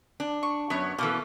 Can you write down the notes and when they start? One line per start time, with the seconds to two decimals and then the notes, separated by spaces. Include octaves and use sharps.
0.20 D4
0.43 C#6
0.70 F#2 B3 C#5
0.99 B2 E3 A#3 C#4 A4